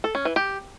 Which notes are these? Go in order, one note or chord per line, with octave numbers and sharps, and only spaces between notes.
A4
C#4
E3
G4